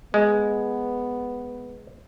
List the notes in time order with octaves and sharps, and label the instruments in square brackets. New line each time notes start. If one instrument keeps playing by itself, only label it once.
[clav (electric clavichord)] G#3 [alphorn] B3